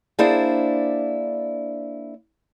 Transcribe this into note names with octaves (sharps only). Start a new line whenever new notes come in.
A#3 D4 E4 G#4 C5 D5